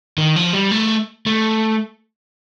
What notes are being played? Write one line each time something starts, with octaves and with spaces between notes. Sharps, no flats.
D#3
F3
G3
A3
A3